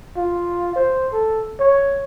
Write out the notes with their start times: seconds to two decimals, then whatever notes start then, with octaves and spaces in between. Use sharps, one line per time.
0.17 F4
0.76 C5
1.13 A4
1.60 C#5